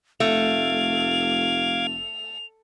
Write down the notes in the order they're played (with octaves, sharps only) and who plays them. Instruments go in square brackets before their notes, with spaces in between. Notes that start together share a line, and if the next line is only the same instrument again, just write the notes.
[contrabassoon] F1 [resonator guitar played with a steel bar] A3 [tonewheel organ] F5 D6 G#6 [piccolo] F7